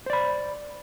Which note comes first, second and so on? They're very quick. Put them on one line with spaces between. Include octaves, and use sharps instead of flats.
C5 D5 B5